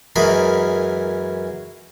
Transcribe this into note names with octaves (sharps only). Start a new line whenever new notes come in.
F#2 E3 G#3 G#4 A#4 B5